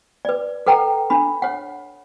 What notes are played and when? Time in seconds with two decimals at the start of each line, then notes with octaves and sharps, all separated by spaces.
0.25 B4 D5
0.66 A4 B4 F#5 G5 A#5
1.10 D4 B5
1.42 C#5 F#5